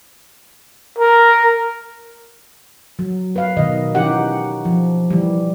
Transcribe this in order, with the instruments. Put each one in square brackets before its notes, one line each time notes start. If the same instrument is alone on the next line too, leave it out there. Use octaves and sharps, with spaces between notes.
[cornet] A#4
[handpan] F#3
B4 F5
B2 D#3 D#5
E3 C#4 D#4 G4 F#5
F3
E3 G3